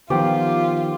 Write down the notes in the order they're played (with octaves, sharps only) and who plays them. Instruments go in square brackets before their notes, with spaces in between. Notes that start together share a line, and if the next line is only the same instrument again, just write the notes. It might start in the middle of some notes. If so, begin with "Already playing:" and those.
[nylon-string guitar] D#3 F3 B3 [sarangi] F4 [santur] G4